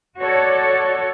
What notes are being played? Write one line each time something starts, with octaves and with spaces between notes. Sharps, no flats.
F#4 A4 C#5 D5